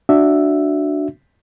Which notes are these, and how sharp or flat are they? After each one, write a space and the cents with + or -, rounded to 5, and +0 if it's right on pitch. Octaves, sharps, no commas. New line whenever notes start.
D4 +5 F#4 -5 E5 +0